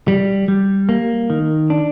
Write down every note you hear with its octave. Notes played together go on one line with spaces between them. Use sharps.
G3
G3
A#3
D#3
D4